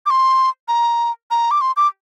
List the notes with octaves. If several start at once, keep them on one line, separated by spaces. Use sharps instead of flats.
D6
C6
A#5
A#5
D6
C6
D6